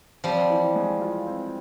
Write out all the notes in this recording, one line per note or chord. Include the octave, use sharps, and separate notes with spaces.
F3 G3 C4
E3
G#3
F4
C4